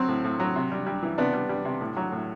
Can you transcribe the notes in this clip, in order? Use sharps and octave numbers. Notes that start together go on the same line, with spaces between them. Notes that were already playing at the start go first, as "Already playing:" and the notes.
Already playing: F#3 C4
A2
A2
F#3
C3
G3
G3
E3
C3 B3 D4
G3
G3
C3
A2
F#3
A2